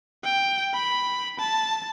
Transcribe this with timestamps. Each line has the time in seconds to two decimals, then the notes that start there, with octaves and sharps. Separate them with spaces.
0.24 G5
0.73 B5
1.39 A5